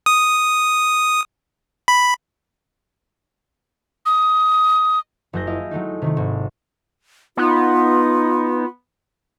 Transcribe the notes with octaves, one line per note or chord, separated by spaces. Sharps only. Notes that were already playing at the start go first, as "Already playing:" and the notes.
D#6
B5
D#6
F#1 F#3 G#4 G6 A#6
E4 F4 D#5
F#3 G#3 A3 D#4
C3 D#3 A3
G#1
B3 D#4 F4